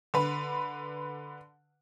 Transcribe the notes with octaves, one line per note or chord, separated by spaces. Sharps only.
D3 B4